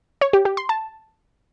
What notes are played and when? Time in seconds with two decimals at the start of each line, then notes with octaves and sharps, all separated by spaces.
0.21 C#5
0.33 G4
0.45 G4
0.57 C6
0.69 A5